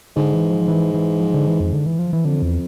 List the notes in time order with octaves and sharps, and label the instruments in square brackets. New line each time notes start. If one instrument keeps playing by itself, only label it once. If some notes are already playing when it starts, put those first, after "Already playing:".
[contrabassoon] G#2 [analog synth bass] D3
[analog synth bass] E3
F3
E3
E3
F3
D3
E3
F2
D3
E3
F3
E3
[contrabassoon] F2 [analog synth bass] D3
[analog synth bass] E2